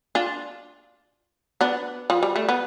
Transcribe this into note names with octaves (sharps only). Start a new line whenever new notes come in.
D4 F4
B3 D4
F3
G3
A3
B3